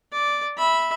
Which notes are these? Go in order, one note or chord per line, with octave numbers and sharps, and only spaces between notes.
D5
E5 B5